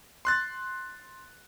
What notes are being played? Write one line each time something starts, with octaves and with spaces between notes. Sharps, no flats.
C6 F#6 A6